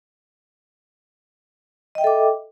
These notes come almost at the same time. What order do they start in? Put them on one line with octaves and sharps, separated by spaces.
D#5 G5 E5 A4 D6